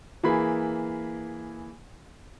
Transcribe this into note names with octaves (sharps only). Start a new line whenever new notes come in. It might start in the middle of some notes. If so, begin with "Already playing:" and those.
E3 A#3 G#4 B5